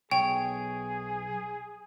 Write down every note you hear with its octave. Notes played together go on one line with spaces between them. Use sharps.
B1 G#4 C#5 G5